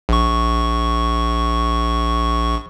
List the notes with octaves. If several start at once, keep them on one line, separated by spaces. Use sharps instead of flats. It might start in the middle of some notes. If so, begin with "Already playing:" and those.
A#1 C#6